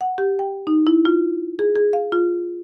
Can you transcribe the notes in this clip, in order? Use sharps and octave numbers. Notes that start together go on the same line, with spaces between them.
F#5
G4
G5
D#4
E4
F4
G#4
G#4
F5
F4